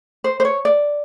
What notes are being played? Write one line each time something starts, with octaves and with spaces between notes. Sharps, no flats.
C5
C5
C#5
D5